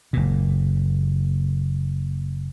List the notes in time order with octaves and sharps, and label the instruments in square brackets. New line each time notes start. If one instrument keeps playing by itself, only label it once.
[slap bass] F#1 A#2